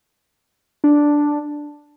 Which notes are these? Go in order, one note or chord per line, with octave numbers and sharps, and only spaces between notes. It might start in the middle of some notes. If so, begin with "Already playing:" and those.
D4